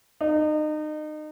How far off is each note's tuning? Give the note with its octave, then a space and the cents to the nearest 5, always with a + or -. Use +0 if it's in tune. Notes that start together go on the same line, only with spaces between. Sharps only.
D#4 -30